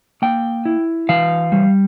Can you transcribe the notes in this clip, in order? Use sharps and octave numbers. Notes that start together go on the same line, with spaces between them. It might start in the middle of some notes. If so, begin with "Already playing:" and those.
A#3 G5
E4
E3 F5
G3